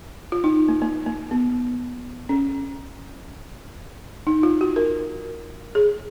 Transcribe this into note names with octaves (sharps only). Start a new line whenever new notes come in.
F4
D#4
A#3
A#3
A#3
B3
C#4
D#4
F4
F#4
A#4
G#4